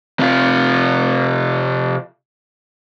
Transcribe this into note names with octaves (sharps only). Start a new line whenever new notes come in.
C3 F4